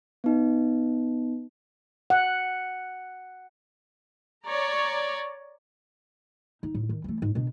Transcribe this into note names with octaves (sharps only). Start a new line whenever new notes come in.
B3 D#4
F#5
C#5 D5 A#5
D#4
A2
D#3
E3 A3
G#2
B2 D4